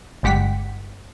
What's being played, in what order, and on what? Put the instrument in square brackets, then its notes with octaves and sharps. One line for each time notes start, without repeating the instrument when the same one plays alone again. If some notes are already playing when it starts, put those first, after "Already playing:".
[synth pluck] G1 G#3 G4 F#5 B6